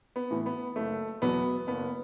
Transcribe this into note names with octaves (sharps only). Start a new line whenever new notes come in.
B3
A2 E3
B3
F#1 A3
E2 B2 F#3 B3
F#1 B3